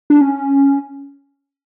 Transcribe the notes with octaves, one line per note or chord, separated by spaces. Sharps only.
D4
C#4